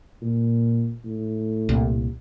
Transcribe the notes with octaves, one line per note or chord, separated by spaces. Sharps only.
A#2
A2
C2 A#2